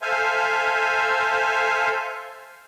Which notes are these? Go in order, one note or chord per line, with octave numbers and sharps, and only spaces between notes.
A4 C5 E5 F5 G#5